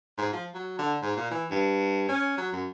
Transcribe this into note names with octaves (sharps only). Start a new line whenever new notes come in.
G#2
F3
F#3
D3
G#2
A#2
E3
G2
C#4
F#3
F#2